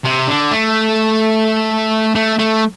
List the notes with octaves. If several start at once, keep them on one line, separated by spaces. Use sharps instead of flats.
C3
D3
A3
A3
A3